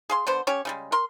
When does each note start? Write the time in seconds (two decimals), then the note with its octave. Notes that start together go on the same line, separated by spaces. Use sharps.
0.10 G#4 F5 C6
0.27 D3 B3 C5
0.47 C#4 G4 C#5
0.65 C#3 G3 G#3
0.92 A#4 C6